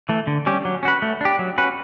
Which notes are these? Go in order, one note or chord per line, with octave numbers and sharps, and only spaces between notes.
E3 A3
D3
G3 C#4 G4
F#3
C#4 F#4 B4
A3
D4 G4
F#3
C#4 F#4 B4